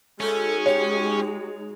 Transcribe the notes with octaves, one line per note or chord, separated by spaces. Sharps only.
G#3 C#4 D#4 F#4 A4
G4 C#5